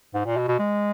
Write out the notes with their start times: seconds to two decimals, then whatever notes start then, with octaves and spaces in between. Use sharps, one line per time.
0.14 G#2
0.26 A#2
0.37 B2
0.48 B2
0.59 G#3